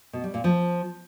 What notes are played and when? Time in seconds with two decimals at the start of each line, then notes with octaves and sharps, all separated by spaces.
0.13 B2
0.24 G3
0.34 A#2
0.44 F3